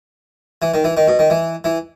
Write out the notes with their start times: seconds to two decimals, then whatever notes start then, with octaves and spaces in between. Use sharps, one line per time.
0.62 E3
0.74 D#3
0.84 E3
0.97 D#3
1.08 B2
1.19 D#3
1.30 E3
1.64 E3